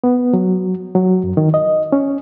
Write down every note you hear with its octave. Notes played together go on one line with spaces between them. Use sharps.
B3
F#3
F#3
F#2
D#3
D#5
C#4